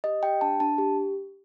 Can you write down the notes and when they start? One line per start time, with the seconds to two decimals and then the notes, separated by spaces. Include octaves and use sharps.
0.04 G4 D#5
0.23 G4 G5
0.41 D4 A5
0.60 D4 A5
0.78 G4